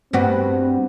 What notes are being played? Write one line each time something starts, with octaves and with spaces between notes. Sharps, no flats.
G2 B3 C4 F#4